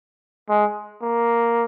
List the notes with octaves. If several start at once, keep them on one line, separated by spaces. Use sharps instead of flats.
G#3
A#3